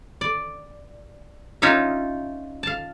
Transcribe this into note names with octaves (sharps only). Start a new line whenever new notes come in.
D5
C#4 D#4 F4 C#5 E5
F5 A5